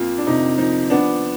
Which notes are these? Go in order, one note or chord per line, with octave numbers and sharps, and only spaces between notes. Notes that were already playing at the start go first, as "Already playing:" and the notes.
Already playing: F2 A#3 F4
D4
C3 D#4
F3 D#4
B3 D4